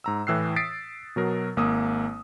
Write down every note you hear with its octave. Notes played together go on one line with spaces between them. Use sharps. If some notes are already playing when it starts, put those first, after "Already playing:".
G#2 A#5 E6
A2 E3 E6 F#6 C7
D#6 A6 B6 C7 D7
B2 F#3 A#4
G#1 A#3 D#6 E6